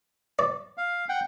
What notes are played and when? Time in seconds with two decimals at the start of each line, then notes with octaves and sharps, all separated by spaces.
0.39 D5
0.77 F5
1.09 F#5 G5